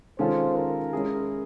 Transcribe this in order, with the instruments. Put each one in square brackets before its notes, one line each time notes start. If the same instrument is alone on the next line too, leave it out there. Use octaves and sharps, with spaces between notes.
[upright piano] D#3 G#3 C#4 F4 A4 [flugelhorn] C5
[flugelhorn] A#4
[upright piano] G#3 C#4 E4 G#4